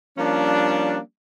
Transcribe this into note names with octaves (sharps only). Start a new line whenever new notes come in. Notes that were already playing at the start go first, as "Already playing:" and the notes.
F3 G3 A#3 C#4 D4